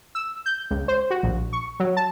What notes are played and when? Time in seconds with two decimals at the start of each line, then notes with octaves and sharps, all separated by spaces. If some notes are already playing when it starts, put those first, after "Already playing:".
0.15 E6
0.46 G6
0.70 C#2
0.88 C5
1.10 F#4
1.23 A#1
1.53 C#6
1.80 F#3
1.97 A5